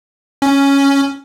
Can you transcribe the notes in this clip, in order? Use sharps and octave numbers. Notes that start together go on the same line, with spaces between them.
C#4